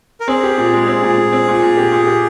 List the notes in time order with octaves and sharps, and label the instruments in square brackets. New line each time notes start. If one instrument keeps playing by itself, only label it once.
[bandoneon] A#4
[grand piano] C4 [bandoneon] G#4
[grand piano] G4
A#2
G#3
C4
A#2
A#2
C4
A#2
A#2
G4
A#2
G4